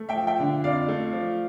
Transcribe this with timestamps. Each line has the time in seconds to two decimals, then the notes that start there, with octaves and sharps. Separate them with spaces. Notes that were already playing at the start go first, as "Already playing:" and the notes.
Already playing: A3
0.09 E5 G5
0.15 F3
0.27 E5 G5
0.39 D3
0.64 F2 D5 F5
0.88 A3
1.13 F3